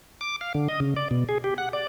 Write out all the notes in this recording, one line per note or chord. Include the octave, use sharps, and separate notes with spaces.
D6
F5
D3
D#5
C#3
D5
B2
G#4
G4
F#5
D5